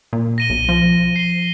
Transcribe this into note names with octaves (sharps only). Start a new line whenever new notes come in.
A#2
A#6 D#7 G7
B1
F3
C7 G7